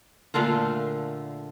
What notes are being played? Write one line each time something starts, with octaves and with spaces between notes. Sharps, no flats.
A#2 D3 A3 F4